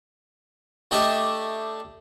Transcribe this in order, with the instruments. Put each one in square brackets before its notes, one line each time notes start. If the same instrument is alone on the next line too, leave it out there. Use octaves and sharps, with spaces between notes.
[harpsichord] A3 D4 G4 D#5 E5